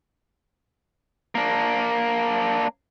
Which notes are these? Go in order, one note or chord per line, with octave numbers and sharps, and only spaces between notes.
A#3 D4